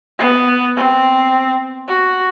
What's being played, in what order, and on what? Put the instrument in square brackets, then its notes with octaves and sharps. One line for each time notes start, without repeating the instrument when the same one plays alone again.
[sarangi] B3
C4
F#4